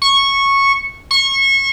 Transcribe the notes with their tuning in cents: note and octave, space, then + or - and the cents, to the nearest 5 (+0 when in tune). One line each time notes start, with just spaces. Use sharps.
C#6 -10
C#6 -25